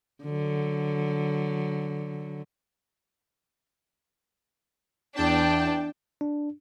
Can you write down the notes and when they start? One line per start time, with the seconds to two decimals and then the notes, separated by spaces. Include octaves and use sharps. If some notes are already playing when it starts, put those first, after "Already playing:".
0.24 D3 F#3
5.16 E2 D4 G5 A5
6.21 D4